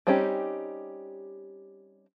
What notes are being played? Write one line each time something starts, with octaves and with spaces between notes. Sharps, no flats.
G3 C4 C#4 D#4 G4